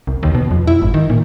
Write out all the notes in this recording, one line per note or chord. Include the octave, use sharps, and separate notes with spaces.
C2
D#2
B2
F2
E4
G#1
D#3
A#2